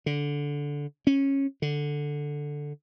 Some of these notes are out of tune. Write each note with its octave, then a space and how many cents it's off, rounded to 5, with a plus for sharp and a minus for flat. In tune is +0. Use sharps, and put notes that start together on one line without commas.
D3 -15
C#4 -15
D3 +0